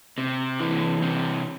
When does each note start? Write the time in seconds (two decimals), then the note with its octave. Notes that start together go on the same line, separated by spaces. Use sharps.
0.18 C3
0.60 E3
1.03 C3